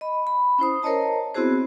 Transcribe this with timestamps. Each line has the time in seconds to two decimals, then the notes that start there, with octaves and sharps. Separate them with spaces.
0.01 D#5 B5
0.27 B5
0.59 C#4 E4 C5 D#6
0.82 A#4 C5 C#5 D#5 A5 A#5
1.34 B3 C4 E4 F#4 G#4 C5